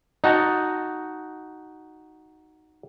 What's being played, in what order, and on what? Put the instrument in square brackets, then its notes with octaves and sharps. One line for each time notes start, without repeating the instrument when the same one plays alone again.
[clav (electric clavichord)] D#4 F#4 A5